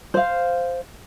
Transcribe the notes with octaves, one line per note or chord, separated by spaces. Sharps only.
C5 F5